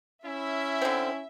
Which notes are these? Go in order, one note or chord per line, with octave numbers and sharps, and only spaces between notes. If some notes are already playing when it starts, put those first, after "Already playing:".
C#4 E4 E5
D3 C4